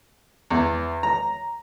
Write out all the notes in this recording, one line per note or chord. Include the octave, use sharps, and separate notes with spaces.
E2
A#5